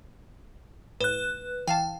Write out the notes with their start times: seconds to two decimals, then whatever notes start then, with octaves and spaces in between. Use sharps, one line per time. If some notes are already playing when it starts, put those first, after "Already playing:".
1.01 A2 B4 F#6
1.67 E3 F5 G5 A5